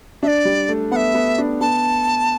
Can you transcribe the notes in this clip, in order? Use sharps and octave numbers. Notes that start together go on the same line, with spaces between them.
D4 D5 E5
G3
A3
B3 E5 F#5
B3
D4
B3 A5